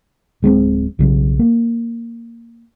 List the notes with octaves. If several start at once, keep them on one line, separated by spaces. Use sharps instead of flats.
D1 G#3 B3 C4
B1 C#3 F#3
A#3